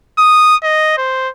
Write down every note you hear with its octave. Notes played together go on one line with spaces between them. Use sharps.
D#6
D#5
C5